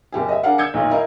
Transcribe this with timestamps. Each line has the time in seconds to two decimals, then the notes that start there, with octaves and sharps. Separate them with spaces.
0.12 F#1 G4 G#4
0.29 D#5 E5
0.44 D4 G#4 A#4 F5 F#5
0.58 E6 G6 G#6 C#7
0.74 B1 A#2 D#3
0.90 E4 A#4 D#5 F5